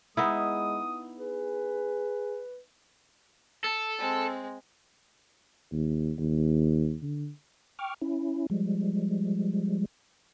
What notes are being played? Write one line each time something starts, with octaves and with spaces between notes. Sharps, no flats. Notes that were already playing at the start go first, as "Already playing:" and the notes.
G#3 B3 D#4 E4 D#6
G#4 B4
A4
G#3 C4
D#2
D#2
D3
G5 C#6 D6 F6
C#4 E4
F3 G3 G#3